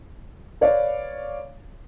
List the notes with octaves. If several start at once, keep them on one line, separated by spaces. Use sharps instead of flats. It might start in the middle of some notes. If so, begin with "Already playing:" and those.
B4 C#5 D5 F5